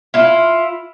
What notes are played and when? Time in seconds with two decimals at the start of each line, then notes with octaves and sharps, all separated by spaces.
0.14 E4 F4